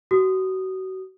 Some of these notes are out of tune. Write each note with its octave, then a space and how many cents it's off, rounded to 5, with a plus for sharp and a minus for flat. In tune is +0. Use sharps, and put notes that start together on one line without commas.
F#4 +30 D#6 -15